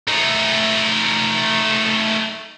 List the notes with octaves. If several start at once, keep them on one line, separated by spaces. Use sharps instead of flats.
A3 D#4